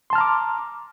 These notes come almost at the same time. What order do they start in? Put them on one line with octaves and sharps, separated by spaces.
C6 A5 F6 A#5 D6